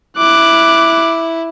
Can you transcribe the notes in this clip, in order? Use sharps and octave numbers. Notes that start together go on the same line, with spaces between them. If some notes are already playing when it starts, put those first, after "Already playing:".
E4 D6 F#6